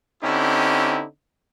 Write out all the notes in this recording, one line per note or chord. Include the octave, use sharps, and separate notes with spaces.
D3 C4 C#4 D#4 E4 G4